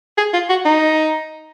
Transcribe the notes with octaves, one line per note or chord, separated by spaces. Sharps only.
G#4
F4
F#4
D#4